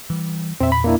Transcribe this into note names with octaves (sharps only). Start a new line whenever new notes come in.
E3 G3
E2 A#2 C4 E5
B5
A#3 D4 E4